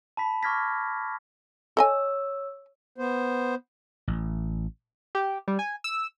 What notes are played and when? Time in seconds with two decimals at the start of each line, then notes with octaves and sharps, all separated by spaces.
0.17 A5 B5 B6
0.43 C#6 D6 F6 G#6 A#6 B6
1.77 A4 C#5 D#5 G#5 E6
2.98 B3 C5
4.08 A1
5.15 G4
5.48 G3
5.59 G#5
5.84 E6